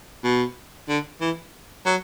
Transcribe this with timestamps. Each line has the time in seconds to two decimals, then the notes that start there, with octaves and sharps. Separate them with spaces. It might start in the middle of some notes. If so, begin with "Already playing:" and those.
0.24 B2
0.89 D3
1.21 E3
1.86 F#3